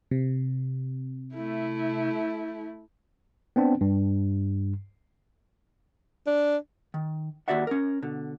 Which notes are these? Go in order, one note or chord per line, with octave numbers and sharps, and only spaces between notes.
C3
A3 E4
B3 C4 D4
G2
D4
D#3
D#2 C#3 F#4 D5 E5 F#5
C#4 A#4
B2 D3